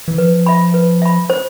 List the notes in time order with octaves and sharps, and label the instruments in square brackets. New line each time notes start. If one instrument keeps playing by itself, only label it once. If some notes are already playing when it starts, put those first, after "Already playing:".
[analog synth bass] E3
[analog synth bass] F3 [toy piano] B4
[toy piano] E5 B5
B4
E5 B5
C5